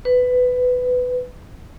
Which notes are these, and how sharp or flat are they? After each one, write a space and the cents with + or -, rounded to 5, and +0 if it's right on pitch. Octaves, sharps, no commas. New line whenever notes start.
B4 +15